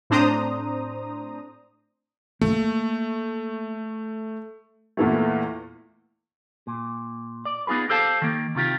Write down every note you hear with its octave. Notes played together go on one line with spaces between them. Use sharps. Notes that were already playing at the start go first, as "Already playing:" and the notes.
A2 C4 D4 C5 A#5 D#6
A3 A#3
E2 A#2 E3 A3
A#2
D5
B3 D#4 F4 G#4 B4
G4 A4 C5 F5 G#5 A5
D#3 A#3
C3 D#3 F4 G4